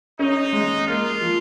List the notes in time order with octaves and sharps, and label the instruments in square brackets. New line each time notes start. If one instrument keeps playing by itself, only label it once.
[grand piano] C#4 [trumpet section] D#4
[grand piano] G#3
[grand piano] A#3 [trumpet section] F4
[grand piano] F3